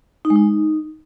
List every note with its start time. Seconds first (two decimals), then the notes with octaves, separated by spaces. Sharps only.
0.25 D#4
0.30 G#3
0.36 D#4